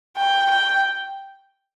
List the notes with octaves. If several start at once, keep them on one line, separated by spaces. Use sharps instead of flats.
G5
G5